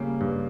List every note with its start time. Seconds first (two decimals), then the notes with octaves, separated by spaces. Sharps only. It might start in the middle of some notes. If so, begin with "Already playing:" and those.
Already playing: C#3 G3 A#3 C#4
0.21 G2